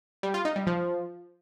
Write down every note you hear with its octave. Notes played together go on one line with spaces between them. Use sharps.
G3
F4
D#4
G3
F3